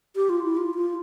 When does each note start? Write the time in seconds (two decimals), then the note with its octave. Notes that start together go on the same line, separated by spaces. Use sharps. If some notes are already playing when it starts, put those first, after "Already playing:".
0.16 G4
0.29 F4
0.44 E4
0.57 F4
0.75 F4